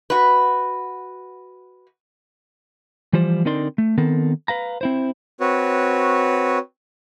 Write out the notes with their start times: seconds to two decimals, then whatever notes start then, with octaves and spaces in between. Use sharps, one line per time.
0.10 F#4 B4
3.13 E3 F3 G3 F4 C5
3.45 D3 C4 D#4 A#4 D5 C6
3.78 A3
3.98 D#3 B3 C4 A4 A#4
4.48 B4 F5 A#5
4.81 C4 E4 C5
5.40 C4 F#4 B4 C#5